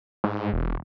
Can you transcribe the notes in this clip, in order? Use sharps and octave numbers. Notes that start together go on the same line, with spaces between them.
G#2
E1